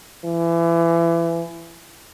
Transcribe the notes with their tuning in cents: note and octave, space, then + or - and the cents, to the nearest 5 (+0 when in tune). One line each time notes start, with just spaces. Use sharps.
E3 +30